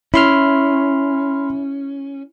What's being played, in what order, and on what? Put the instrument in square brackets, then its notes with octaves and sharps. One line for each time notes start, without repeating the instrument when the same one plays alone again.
[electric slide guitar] C#4 [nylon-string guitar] E4 [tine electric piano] B5 C6 F6